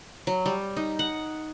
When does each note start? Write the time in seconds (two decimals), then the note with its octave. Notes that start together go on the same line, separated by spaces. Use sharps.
0.27 F#3
0.46 G3
0.77 D#4
0.99 F#5